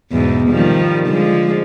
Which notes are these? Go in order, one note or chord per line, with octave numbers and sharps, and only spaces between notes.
E2 G#2 B2
D#3 F3 G3
D3 F3 G#3